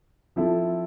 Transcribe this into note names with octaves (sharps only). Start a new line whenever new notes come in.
F3 C4 E4 A4